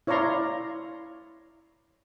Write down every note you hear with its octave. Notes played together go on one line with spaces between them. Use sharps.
E4 C#5 D5 F5 A#5 C6